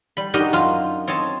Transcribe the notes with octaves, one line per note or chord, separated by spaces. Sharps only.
G3 B5
D4 D#4 F#4 G4 A#4 D#5
F#2 F4
C4 C#5 D#5 A5